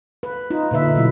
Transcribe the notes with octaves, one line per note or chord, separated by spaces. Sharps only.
B4
D#4 F4
A#2 D3 B4 E5
B2 F#3 E4